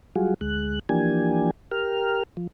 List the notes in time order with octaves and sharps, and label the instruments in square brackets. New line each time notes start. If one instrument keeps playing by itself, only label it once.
[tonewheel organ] F#3 G3 F4 F#4 G#4
D2 G#3 F#6
E3 F3 A#3 D4 G4 G#5
G4 A#4 F6
F3